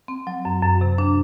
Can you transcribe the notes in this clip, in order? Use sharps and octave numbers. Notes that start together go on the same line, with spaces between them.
C4
F#3
F#2
F#2
C3
D4